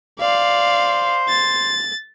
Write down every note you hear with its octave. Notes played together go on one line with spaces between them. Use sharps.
C5 D5 F5
A6